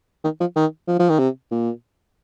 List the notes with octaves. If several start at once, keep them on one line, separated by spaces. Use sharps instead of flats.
D#3
F3
D#3
F3
F3
D#3
C3
A#2